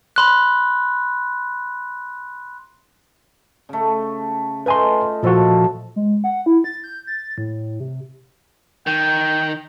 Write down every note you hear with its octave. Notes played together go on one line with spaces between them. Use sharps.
B5 C6 F#6
C#3 A3
A3 D#4 F4 B4 G#5 C6
A#2 F3 D#4 F#4 A4
G#3
F#5
E4
A6
G6
A6
A2
C3
D#3 G5